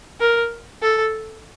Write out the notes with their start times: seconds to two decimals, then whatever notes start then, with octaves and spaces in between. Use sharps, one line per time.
0.20 A#4
0.82 A4